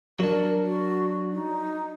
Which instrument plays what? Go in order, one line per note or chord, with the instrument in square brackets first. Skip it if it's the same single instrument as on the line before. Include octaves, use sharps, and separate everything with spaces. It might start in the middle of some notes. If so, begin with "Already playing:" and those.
[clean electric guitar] F#3 D4 [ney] A#4
[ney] F#4
D#4